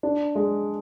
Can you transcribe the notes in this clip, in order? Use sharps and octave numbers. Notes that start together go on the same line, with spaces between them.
D4
G#3